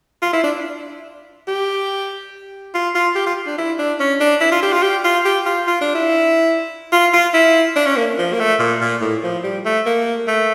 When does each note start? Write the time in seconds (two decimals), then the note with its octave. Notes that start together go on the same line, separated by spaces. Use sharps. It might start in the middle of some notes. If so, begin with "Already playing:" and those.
0.22 F4
0.33 E4
0.44 D4
1.48 G4
2.74 F4
2.95 F4
3.15 G4
3.26 F4
3.46 D4
3.58 E4
3.79 D4
4.00 C#4
4.20 D4
4.41 E4
4.52 F4
4.63 G4
4.72 F4
4.83 G4
5.04 F4
5.25 G4
5.46 F4
5.67 F4
5.81 D4
5.95 E4
6.92 F4
7.13 F4
7.34 E4
7.76 D4
7.87 C#4
7.97 A#3
8.18 F3
8.33 A#3
8.40 A3
8.60 A#2
8.81 A#2
9.01 A2
9.23 F3
9.44 G3
9.65 A3
9.86 A#3
10.28 A3